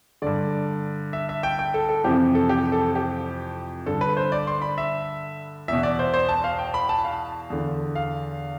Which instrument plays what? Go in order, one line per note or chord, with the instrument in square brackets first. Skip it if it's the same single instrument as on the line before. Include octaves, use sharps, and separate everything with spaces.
[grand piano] G2 D3 D5
E5
E5
G5
G5
A4
A4
F2 C3 E3 G4
A4
G4
A4
G4
G2 D3 A4
B4
C5
D5
C6
B5
E5
E2 B2 E5
D5
C5
C5
A5
F5
G5
B5
A5
F5
E2 D3
F5